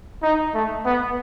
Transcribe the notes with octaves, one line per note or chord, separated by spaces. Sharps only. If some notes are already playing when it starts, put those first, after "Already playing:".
D#4
A3
B3